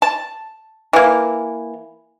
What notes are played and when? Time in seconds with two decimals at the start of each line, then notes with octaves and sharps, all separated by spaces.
0.02 A5
0.93 E3 A#3